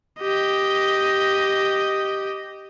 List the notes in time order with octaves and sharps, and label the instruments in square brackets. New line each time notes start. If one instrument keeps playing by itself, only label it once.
[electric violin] G4 D#5